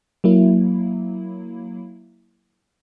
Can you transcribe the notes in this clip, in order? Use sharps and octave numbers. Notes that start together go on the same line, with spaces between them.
F#3 A#3 E4